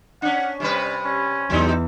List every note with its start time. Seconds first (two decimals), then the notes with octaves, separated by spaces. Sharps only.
0.22 C#4 D4 F#5
0.60 C3 G3 C#4 B4
1.04 C#4
1.50 E2 F#3 G#3 D#4